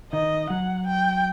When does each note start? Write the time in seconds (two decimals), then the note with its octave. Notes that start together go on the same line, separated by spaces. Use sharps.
0.12 D#3 D#5
0.50 F#3 F#5
0.87 G5